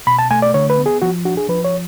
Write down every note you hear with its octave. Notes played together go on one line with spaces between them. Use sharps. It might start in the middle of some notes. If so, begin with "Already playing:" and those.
B2 B5
A5
A3 G#5
D5
D3 C#5
B4
B3
G#4
F3 F#4
D4 F#4
G#4
F3 B4
C#5